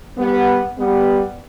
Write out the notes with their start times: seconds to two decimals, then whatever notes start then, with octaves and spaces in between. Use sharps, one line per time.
0.17 G3 B3
0.78 G3 B3